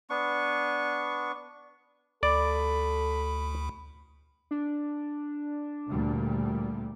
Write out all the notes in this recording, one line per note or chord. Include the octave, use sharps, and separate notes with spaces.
B3 D4 C#6
D2 A4 D5 B5
D4
D2 A#2 G3